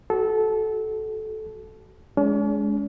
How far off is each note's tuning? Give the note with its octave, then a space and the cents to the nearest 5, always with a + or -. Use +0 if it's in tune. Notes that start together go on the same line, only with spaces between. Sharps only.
F#4 +30 A4 -20
G#3 +10 C#4 +45